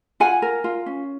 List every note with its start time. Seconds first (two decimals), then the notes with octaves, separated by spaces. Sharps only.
0.20 F4 F#5 G#5
0.42 A#4
0.64 F4
0.86 C#4